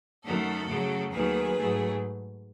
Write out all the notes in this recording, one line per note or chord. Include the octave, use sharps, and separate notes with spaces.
F#2 D#3 A3 F#4 A4
F#2 C#3 F#3 A3
D#2 D#3 F#3 A3 G#4 B4
G#2 F#3 A3